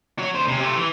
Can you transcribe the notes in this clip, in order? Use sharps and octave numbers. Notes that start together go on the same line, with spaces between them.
F#4 C#5
D2 C5
C3 C#4
C3 A3
E3